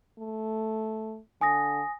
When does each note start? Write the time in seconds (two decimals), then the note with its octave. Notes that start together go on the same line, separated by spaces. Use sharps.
0.19 A3
1.41 D3 G#5 D#6 A#6